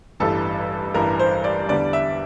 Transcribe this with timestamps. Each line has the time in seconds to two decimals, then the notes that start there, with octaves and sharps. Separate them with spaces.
0.20 A1 G2 E3 G3 A4
0.94 A1 G2 E3 G3 A#4
1.19 C5
1.44 D5
1.68 E2 D3 G3 D5
1.93 E5